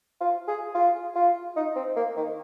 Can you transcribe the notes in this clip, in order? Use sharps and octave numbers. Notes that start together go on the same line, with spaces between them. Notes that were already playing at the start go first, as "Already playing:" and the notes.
F4
G#4
F4
F4
D#4
C4
A#3
D#3